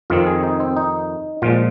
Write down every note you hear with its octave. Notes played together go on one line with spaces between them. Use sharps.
F2 D#3 C4 F4
G#4
D#4
C4
D#4
A#2 F3 G#3 F4